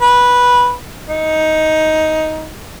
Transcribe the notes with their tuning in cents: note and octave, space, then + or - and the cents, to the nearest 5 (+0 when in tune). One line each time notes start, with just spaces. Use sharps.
B4 -10
D#4 +10